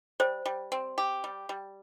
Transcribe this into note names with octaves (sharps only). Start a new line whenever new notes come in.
G3 C5
G3
C4
G4
G3
G3